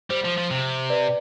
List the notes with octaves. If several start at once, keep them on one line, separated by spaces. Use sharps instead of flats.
G3 C5
F3
F3
C3
B4 D5